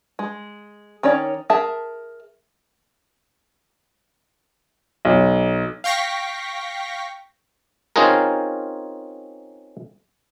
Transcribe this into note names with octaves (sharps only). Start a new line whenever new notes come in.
G#3
D#3 C#4 C#5 D5
G#4 A#4 E5 A5
B1
F5 G5 C#6 A#6 B6
C4 C#4 D#4 F4 G#4 A#4